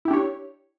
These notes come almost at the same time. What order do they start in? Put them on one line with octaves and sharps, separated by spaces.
E4 G4 D4 C#5